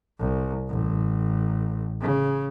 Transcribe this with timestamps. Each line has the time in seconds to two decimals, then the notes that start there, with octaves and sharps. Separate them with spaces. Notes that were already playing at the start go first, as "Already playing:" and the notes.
0.19 C2
0.69 A1
2.00 C#3